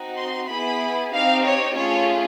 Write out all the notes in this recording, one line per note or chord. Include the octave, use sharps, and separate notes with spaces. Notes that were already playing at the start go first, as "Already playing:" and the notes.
Already playing: C4 D#4 F#4
C6
B3 E4 G#4 B5
C4 D#4 G4 F5
C#5
A3 C#4 F4 G#4 C#5